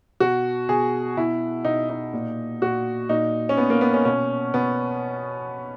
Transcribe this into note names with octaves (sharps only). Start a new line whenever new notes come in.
B2 F#4
B2 G#4
B2 E4
B2 D#4
D#4
A#2
A#2 F#4
A#2 D#4
C#4
A#2 B3
A#3
B3
C#4
B2 C#4
B2 B3